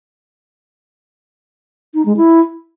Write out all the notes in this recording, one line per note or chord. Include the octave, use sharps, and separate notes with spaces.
D#4
G#3
E4